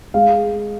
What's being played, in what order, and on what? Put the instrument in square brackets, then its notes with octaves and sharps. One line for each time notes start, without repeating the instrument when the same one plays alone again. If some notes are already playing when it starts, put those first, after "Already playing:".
[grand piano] G#3 F5